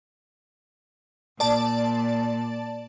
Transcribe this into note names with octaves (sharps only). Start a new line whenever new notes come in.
A#2 D5 A5